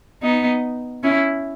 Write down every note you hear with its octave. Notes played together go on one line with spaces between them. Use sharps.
B3 D#4
C#4 E4